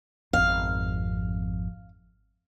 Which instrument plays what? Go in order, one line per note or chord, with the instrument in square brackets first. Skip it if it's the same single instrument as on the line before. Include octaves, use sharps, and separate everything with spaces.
[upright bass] G#1 F2 [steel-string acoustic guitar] F5